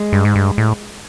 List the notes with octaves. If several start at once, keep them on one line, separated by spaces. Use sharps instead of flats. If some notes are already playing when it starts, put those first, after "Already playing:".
Already playing: G#3
G2
G#2
G2
A2